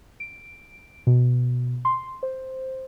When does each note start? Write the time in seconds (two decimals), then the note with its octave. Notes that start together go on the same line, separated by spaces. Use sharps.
0.20 D7
1.07 B2
1.85 C6
2.23 C5